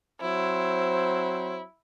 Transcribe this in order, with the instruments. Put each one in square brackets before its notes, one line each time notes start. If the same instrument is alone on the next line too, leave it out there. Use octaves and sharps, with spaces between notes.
[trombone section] F#3 C4 C5 [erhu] E4